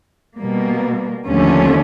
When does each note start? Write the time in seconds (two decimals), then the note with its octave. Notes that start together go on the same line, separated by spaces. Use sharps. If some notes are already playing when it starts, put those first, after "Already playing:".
0.39 B2 G3 A#3
1.27 D#2 D3 F3 A3 C#4